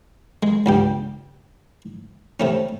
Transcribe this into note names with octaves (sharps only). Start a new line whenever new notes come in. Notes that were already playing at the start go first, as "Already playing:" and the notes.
G#3
C#2 G2 G4
C3 A3 C#4